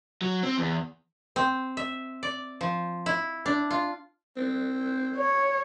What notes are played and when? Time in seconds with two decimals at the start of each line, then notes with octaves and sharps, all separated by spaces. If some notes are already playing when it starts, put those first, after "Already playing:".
0.22 F#3
0.43 C4
0.58 E2
1.36 C4
1.77 E5
2.23 D5
2.61 F3
3.06 E4
3.46 D4
3.71 F4
4.37 C4
5.16 C#5